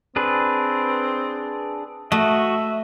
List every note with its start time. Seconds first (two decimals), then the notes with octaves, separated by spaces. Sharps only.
0.16 C4 D4 G#4 B4
2.12 A3 F#4 D#5 E5